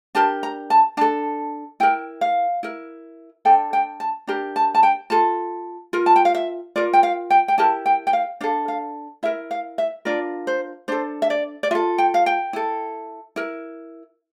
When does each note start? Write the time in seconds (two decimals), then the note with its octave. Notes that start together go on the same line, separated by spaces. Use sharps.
0.15 D4 G4 A#4 A5
0.43 A#5
0.70 A5
0.97 D4 A4 A5
1.80 E4 A#4 G5
2.21 F5
2.63 E4 A#4
3.45 D4 A4 G5
3.73 G5
4.00 A5
4.27 D4 G4 A#4 A#5
4.56 A5
4.75 A5
4.83 G5
5.10 F4 A4 A5
5.93 F4 A#4
6.06 A5
6.16 G5
6.25 F5
6.35 E5
6.76 F4 A#4 D5
6.93 G5
7.03 F5
7.30 G5
7.48 G5
7.58 E4 G4 A#4 A5
7.86 G5
8.07 G5
8.13 F5
8.41 D4 A4 F5
8.68 F5
9.23 E4 A#4 E5
9.51 F5
9.78 E5
10.05 D4 F4 A#4 D5
10.47 C5
10.88 D4 A4 C5
11.22 E5
11.30 D5
11.63 D5
11.71 F4 E5
11.75 A4
11.98 G5
12.14 F5
12.26 G5
12.53 E4 A4
13.36 E4 A#4